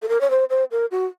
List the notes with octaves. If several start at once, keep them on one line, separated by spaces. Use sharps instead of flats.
A4
A#4
C#5
C5
C5
A#4
F#4